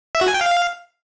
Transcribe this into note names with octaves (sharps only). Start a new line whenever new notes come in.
E5
F#4
G#5
G5
F5